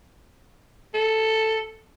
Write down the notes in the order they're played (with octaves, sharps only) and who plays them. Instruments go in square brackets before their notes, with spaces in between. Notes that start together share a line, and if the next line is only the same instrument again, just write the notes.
[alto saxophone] A4